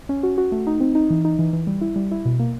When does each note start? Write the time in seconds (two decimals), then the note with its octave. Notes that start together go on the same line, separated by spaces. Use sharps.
0.09 C#4
0.23 F#4
0.38 F#4
0.52 A3
0.67 D#4
0.80 C4
0.95 D#4
1.10 E3
1.25 D#4
1.39 E3
1.53 E3
1.67 G3
1.81 E4
1.96 G3
2.11 E4
2.25 B2
2.39 A#3